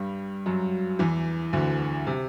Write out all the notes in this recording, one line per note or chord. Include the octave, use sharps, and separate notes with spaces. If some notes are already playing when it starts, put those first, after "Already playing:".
Already playing: G2 G3
F#2 F#3
E2 E3
D2 D3
C3